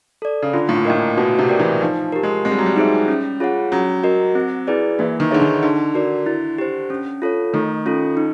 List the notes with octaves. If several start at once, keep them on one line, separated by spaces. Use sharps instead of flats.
A4 D5
C#3
D3 F4
A2
A#2
A2 A#4 D#5 G5
A#2
B2 F#4
C3
A#4 D5 G5
E3
F3 D#4
G4 A#4
G#3
G#3 C4
G3
F#3
G3
D#4 G#4 C5 E5
C#4
F4 G#4 C#5 F#5
F#3 C#4
F#4 A#4 D#5
C4
E4 G#4 B4 D5
E3 A#3
D#3
D3 D#4 G#4 C#5 E5
D#3
D3 D#4
F#4 A#4 D5
E4
G4 C5
C#4
F4 A4 C#5
D#3 A3
C#4 F4 A4
D#4